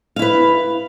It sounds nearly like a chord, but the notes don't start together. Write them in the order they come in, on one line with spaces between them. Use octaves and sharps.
F5 E4 B4